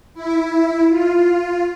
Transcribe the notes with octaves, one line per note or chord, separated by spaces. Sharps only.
E4
F4